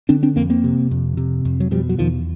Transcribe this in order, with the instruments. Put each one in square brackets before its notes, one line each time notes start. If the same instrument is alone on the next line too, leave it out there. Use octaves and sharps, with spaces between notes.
[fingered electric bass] D3 C4 D4
C4 D4
F2 A#3 C4
A#3 C4
C3
F2
C3
F2
F#3
B2 F3 G3
F#3
E2 D#3 F3